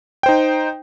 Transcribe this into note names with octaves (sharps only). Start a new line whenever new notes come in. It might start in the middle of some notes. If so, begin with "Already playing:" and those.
D#4 C5 G5